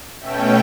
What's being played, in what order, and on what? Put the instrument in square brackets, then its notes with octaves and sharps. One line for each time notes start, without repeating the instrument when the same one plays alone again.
[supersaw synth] B2 A3 C#4 E5 G5